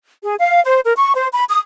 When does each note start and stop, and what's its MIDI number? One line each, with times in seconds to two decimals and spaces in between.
0.24 0.34 68
0.39 0.60 77
0.64 0.81 72
0.84 0.92 70
0.97 1.14 85
1.16 1.28 72
1.34 1.45 83
1.49 1.59 87